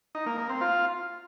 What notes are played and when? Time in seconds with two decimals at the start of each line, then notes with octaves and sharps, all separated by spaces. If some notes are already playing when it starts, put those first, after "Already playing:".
0.15 D#4
0.26 A#3
0.38 A#3
0.49 C4
0.61 F4